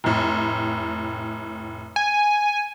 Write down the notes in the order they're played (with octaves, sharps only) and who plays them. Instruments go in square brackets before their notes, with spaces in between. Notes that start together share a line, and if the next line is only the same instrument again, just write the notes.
[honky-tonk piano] F1 A2
[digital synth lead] G#5